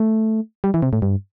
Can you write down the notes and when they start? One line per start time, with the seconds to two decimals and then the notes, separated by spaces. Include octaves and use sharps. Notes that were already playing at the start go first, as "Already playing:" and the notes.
Already playing: A3
0.64 G3
0.74 E3
0.82 C3
0.93 A2
1.02 G2